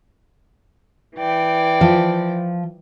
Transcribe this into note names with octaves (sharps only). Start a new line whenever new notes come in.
E3 D5 G5
F3